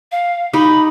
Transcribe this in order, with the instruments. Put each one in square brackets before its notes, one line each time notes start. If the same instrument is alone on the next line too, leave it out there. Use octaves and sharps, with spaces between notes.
[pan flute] F5
[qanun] D#4 G4 [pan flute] B5